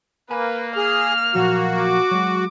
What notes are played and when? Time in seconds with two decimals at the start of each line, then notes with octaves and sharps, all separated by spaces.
0.31 A#3 B4 G#5 B5
0.77 G#4 F6
1.35 A#2 F3 F#3 F#4
1.81 D6
2.11 F#3 G#3